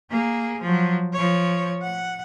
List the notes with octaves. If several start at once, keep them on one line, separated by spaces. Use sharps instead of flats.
A#3 G#4
F3 F#3
F3 C#5
F#5